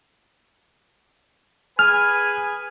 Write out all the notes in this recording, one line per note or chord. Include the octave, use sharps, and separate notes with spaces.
G#4 B4 G#5 F6